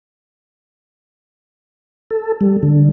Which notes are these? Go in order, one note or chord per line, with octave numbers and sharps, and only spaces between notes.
A4
G3
D3